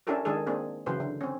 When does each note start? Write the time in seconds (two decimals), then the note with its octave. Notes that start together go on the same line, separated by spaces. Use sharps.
0.07 C#4 D4 E4 G4 A4 A#4
0.25 D#3 G#3 D4 G#4 A4
0.47 A#3 C4 D4 G#4
0.86 C#3 E3 F#3 B4 C5
1.00 D3
1.21 C4 C#4